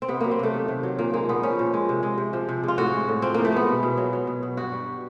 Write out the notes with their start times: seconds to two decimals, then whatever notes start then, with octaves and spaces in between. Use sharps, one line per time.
0.02 C4
0.08 C3 B3
0.20 F#3 A#3
0.31 C4
0.39 C3 A3
0.54 D#3
0.68 C3
0.83 F#3
0.99 A#2 A#3
1.14 G#3 A#3
1.29 A#2 B3
1.43 F3 C#4
1.59 A#2
1.74 G#3
1.89 C3
2.03 G#3
2.18 C3
2.33 F3
2.49 C3
2.64 G#3 F4
2.78 A2 F#4
2.93 G#3
3.09 A2
3.22 F3 C4
3.34 A2 A#3
3.45 A3
3.52 G#3 B3
3.68 B2
3.83 B2
3.97 F#3
4.13 F#3
4.27 B2
4.43 B2
4.57 G2 F#4
4.72 G3